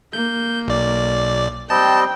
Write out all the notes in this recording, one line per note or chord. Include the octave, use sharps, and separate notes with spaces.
A#3 G6
B1 D5
G3 C4 D#5 G5 A5